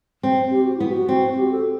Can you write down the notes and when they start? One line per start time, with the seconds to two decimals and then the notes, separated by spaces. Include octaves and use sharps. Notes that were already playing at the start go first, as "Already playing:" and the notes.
0.23 C4
0.51 G4
0.64 F#4
0.77 B3 E4
0.89 F#4
1.08 C4
1.37 G4
1.51 A4